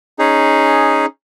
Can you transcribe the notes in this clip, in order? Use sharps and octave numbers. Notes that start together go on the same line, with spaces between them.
C#4 D#4 G#4